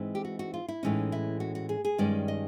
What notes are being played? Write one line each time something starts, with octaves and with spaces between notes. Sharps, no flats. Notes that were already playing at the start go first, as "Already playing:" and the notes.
Already playing: G#2 E3 G#3 C4 D#4
G4
F#4
F#4
F4
E4
A2 E3 G#3 C#4 D#4
E4
F#4
F#4
G#4
G#4
G2 D#3 G#3 C#4 D5
D#5